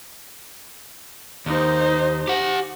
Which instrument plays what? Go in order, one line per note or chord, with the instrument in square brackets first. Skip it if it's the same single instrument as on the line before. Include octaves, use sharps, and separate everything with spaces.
[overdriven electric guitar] D#2 [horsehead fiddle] D#4 C5
[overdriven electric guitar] G4 F#5